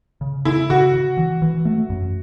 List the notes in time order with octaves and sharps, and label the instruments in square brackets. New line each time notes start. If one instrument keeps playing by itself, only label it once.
[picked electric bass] C#3
[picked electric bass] C#3 [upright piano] E4
[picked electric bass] C#3 [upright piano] F#4
[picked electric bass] C#3
E3
E3
A3
F#2